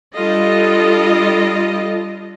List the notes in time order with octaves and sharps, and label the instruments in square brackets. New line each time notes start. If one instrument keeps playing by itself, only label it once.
[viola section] G3 D4 F4 A4 D#5